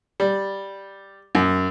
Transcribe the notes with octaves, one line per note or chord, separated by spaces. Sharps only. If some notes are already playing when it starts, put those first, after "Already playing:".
G3
F#2